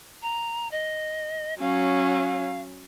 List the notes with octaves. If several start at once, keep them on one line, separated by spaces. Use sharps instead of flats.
A#5
D#5
F#3 C#4 F5